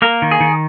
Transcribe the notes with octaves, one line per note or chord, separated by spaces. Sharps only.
A#3 A#4
D#3
G#4
D#3